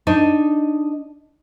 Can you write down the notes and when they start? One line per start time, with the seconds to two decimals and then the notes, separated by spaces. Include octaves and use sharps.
0.07 D4 D#4